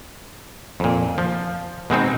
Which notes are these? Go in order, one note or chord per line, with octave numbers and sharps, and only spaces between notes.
F2 A#2
F3
B2 G#3 C4 D#4